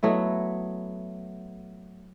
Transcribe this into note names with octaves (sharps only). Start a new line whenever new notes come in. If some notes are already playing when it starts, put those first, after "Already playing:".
F#3 A3 B3 E4